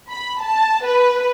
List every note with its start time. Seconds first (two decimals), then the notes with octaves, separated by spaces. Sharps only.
0.10 B5
0.42 A5
0.85 B4